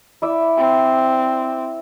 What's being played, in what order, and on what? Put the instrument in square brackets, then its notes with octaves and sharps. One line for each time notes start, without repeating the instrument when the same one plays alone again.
[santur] E4 D5 E5
[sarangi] C4